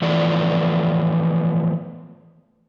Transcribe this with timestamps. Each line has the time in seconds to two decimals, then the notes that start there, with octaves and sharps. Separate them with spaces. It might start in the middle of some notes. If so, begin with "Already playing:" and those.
0.02 E3 F3 A3 B3 D5